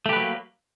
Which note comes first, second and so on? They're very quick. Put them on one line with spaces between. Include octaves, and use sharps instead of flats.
A3 G4 B4 F#3 A#3